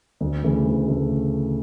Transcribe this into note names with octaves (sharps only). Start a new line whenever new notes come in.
D2
C#3 E3 A3
D2
C#3 E3 A3